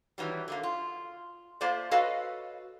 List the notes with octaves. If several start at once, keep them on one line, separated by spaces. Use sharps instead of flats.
D#3 E3 F#3 G3
D3 A3 A#3
F4
A3 A#3 F4 C5 D5
F#4 A4 B4 C#5 D#5 F5